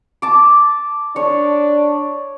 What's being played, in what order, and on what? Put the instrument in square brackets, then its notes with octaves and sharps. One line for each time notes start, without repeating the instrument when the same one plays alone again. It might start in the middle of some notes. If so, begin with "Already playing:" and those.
[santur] A5 D6
[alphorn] D4 [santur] C#5